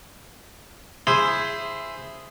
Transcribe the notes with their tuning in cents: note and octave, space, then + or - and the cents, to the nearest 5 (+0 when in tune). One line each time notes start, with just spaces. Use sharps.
E4 +10 G#4 +0 C5 +0